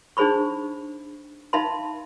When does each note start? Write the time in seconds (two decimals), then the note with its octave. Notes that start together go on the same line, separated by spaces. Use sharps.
0.17 D4 D#4 G#4 C5 B5 C#6
1.53 D#4 E5 F5 A5 B5 C6